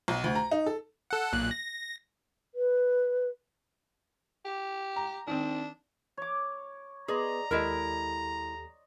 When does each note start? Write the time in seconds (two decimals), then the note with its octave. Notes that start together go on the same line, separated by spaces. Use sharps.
0.08 B1
0.24 D2
0.35 A#5
0.51 D#4
0.66 A4
1.11 A4 F#5
1.33 B1 A#2 F#6
1.51 A#6
2.55 B4
4.45 G4
4.96 A#5
5.27 D#3 C4 D4
6.17 C#5 D6
7.08 B3 G#4 B4 D5 D#5 A#5 C6
7.51 D#2 G#3 E4 G4 A4 A#4